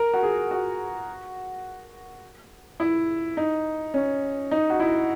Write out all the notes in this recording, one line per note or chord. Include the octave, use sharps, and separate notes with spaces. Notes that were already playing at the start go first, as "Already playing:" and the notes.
Already playing: A#4
F#4
G#4
F#4
E4
D#4
C#4
D#4
F#4
E4